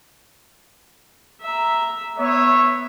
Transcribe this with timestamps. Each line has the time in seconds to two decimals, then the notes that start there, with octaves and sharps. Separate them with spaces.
1.41 E5 A#5
2.17 B3 C#5 E5